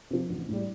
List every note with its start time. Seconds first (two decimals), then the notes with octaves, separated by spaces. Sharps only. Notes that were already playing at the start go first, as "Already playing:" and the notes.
0.11 C3 F3
0.30 A1
0.48 A2 G3